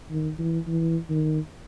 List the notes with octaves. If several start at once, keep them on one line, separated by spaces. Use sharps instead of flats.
D#3
E3
E3
D#3